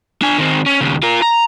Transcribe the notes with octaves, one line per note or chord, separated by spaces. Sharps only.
D4 G#5
D#3 C4
C#4
D#2 C#3
F4 A#4
A#5